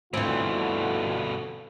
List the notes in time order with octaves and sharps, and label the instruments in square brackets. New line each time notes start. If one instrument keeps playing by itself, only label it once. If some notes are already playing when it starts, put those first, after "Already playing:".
[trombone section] D2 F4 [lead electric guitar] G2 B2 [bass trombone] D3 [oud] E3 C4